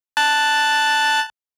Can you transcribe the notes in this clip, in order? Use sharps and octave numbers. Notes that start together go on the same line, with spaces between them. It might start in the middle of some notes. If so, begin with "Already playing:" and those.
A5 F#6 A6